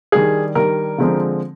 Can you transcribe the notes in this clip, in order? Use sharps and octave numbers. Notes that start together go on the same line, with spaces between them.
D#3 G3 D4 G#4
D#3 G3 D4 A#4
D3 F3 G#3 C4